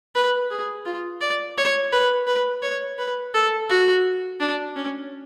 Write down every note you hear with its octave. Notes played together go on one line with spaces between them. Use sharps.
B4
G#4
F4
D5
C#5
B4
B4
C#5
B4
A4
F#4
D4
C#4